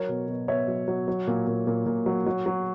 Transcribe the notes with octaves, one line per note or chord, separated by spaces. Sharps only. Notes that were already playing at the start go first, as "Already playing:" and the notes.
Already playing: F#3 A#4 C#5
B2
B2
B2 C#5 E5
F#3
F#3
F#3
A#2
A#2
A#2
A#2
F#3
F#3
F#3